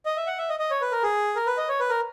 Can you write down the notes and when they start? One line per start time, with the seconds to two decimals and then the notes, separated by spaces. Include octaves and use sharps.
0.06 D#5
0.17 E5
0.27 F#5
0.38 E5
0.49 D#5
0.60 D#5
0.71 C#5
0.81 B4
0.92 A#4
1.03 G#4
1.36 A#4
1.46 B4
1.57 D#5
1.69 C#5
1.79 B4
1.89 A#4